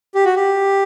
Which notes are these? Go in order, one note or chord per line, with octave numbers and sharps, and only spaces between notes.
G4
F#4
G4